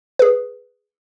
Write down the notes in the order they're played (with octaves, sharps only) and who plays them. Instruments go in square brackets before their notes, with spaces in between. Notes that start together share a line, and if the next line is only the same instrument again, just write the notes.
[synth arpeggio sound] G#4 B4